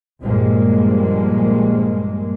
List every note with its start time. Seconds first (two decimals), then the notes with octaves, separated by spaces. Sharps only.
0.22 A#1 G2 A#2 F3 G#3 A#3